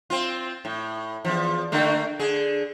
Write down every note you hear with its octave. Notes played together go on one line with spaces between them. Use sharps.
C4 F4
A2
E2 G2 F3
D3 A3 A#3
D3 G#4